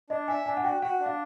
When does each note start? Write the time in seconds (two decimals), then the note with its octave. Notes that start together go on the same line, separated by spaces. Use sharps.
0.10 D4 D#5
0.28 E5 G#5
0.46 D4 G#5
0.57 F#5
0.64 F#4 G5
0.82 F#4 F#5
1.00 D4
1.06 F5